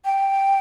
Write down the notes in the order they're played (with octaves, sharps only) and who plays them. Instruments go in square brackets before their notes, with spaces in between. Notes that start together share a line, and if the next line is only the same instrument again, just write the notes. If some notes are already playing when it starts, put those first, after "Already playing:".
[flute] G5